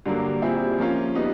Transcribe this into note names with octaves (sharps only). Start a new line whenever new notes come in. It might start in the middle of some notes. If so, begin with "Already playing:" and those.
G2 D3 F#3 A#3
A#2 G3 C4 E4 G#4
F3 A#3 C#4 F4
G3 B3 D#4